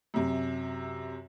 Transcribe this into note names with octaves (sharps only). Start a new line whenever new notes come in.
F#2 C3